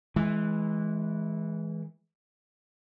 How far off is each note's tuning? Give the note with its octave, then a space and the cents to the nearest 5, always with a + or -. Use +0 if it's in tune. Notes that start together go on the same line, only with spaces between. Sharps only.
E3 -10 G#3 +15